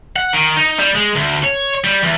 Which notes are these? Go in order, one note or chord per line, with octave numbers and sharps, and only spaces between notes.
F#5
D#3
D#4
G3
G#3
D2
C#5
G3
E2